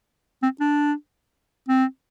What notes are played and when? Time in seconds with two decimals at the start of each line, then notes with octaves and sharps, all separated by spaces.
0.42 C4
0.60 D4
1.68 C4